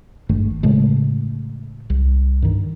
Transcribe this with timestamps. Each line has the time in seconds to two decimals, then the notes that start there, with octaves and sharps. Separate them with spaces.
0.29 G#1 G2 D#3 A3
0.63 A2 C#3 G#3 A3
1.90 C2
2.42 G2 D#3